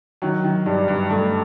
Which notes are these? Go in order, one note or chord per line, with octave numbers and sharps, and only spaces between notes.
D#3 F#3
D#3
G2 G3
G2
G2 A3